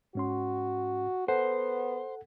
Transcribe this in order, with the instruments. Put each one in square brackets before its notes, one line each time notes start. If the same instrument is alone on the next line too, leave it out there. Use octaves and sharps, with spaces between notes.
[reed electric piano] G#2 C#4 C6 [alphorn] F#4
[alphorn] B3 [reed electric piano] A4 F#5 [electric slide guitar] C5